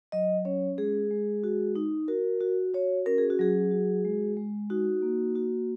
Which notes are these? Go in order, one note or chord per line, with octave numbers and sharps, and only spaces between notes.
F#3 D#5
C#4 C#5
G#3 G#4
G#3
F#4
D#4
F#4 A#4
F#4
F#4 C#5
C#4 A#4
G#4
F#4
F#3 G#4
F#4
G#3
G#3
D#4 F#4
A#3
F#4